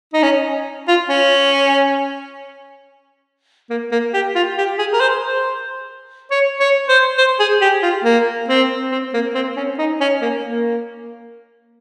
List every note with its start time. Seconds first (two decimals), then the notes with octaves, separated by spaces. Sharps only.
0.14 D#4
0.23 C#4
0.88 F4
1.09 C#4
3.70 A#3
3.91 A#3
4.14 G4
4.35 F4
4.58 G4
4.79 G#4
4.93 A#4
5.00 C5
5.22 C5
6.31 C#5
6.60 C#5
6.89 C5
7.18 C5
7.40 G#4
7.61 G4
7.83 F4
8.05 A#3
8.48 C4
8.92 C4
9.14 A#3
9.35 C4
9.57 C#4
9.79 D#4
10.01 C#4
10.22 A#3
10.44 A#3